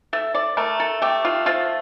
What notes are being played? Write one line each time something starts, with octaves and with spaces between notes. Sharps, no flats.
A3 E5
D5
A3 A#4
A4
A3 G4
F4
F3 F4